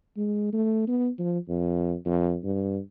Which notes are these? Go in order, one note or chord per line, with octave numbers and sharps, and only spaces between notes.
G#3
A3
B3
F3
F2
F2
G2